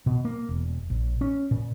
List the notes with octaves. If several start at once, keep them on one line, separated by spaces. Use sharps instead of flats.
B2
A#3
E1
A#1
C#4
A#2